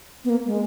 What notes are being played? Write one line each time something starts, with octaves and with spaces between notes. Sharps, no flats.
B3
A#3
G#3